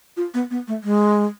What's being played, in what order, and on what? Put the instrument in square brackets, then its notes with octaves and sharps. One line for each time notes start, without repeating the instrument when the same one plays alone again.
[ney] F4
B3
B3
A3
G#3